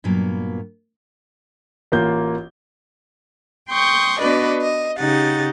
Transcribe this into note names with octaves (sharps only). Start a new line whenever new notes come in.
G2 A#2 F#3 A#3 B3
A1 A#3 F4 G6
G5 C6 C#6 D#6 G6
B3 D4 F#4 B4 D5 D#5
D#5
C#3 D#4 G4 F#5 A6